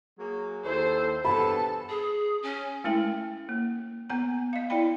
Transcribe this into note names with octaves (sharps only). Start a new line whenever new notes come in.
F#3 A#3 G#4
D#2 E4 A4 C5
G2 E3 B3 A4 A5 B5
G#4
C#4
G#3 A3 C#4 E4 A#4 G5
A#3
B3 G#5 A#5
D#5 F5
E4 D5 G5 B5